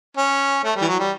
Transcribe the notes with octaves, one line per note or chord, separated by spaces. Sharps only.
C#4
A3
G3
E3
F#3
G3